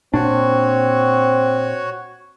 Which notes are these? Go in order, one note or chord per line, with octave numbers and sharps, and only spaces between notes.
A#2 C4 D4 F#4 C#5